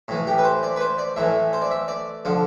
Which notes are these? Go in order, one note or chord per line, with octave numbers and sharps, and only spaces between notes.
A2 E3
G4
B4
C5
D5
B4
C5
D5
A2 E3 E5
C5
D5
E5
D5
D3 F3